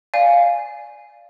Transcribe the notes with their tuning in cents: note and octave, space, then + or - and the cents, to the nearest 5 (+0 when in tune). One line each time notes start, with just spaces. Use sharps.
D5 +0 F5 +0 G#5 +0